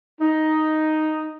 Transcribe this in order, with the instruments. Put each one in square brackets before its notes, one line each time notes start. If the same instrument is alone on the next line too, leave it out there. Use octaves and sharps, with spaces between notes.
[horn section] D#4